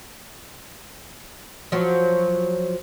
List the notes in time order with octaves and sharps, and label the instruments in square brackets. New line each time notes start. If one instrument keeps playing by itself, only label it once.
[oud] F3 F#3